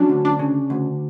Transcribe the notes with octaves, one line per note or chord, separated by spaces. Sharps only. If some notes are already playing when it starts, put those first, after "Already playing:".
Already playing: F#3 C#4 D4
D2
D4
C#3
D2